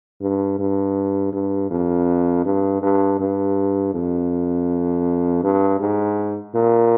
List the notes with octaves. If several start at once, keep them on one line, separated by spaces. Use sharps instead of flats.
G2
G2
G2
F2
G2
G2
G2
F2
G2
G#2
A#2